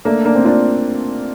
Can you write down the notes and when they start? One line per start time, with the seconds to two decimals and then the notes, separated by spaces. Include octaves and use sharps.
0.05 A3 A#3 D4
0.25 A#3 D4
0.35 C4
0.45 D4 F4